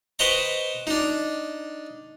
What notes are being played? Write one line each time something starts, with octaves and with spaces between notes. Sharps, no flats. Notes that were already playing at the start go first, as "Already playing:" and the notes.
B4 C5 D#5 G5 A#5 C#6
D4 D#4